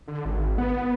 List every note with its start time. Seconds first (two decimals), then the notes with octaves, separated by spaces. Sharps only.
0.08 D3
0.25 G#1
0.58 B3